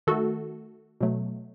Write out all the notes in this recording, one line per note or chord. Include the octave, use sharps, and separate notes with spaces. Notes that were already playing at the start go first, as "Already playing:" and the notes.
D#3 A3 F#4 A4
B2 F#3 A3